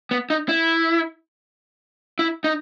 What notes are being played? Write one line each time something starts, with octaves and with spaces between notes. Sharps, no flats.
B3
D#4
E4
E4
D#4